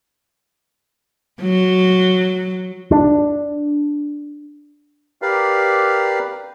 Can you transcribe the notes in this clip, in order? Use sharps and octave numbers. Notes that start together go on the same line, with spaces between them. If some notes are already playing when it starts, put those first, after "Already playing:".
F#3
D4
G4 A#4 B4 D5 F5